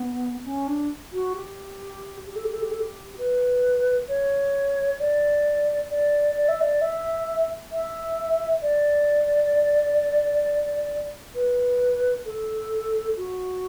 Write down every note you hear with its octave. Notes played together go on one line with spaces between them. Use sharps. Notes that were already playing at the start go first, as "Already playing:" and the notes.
Already playing: B3
C#4
D4
F#4
G4
G4
A4
G4
A4
G4
A4
G4
B4
C#5
D5
D5
D5
E5
D5
E5
E5
D5
B4
A4
F#4